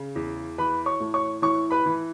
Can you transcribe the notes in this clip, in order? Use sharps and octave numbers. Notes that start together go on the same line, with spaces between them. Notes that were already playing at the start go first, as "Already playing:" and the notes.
Already playing: C#3
E2
E3 B4 B5
C#5 C#6
A2
C#5 C#6
E3 C#5 C#6
B4 B5
E3